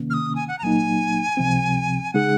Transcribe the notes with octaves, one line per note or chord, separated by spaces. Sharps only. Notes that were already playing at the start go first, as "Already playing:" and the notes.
Already playing: C3 D#3 A#3 C#4
F6
D#6
G#5
F#5
A#5
C2 A#2 F#3 A#3 D#4 G#5
C#2 C3 F3 C4
C#3 G#3 D#4 G#4 F#5